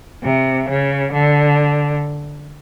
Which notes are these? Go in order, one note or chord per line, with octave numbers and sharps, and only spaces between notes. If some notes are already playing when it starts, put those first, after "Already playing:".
C3
C#3
D3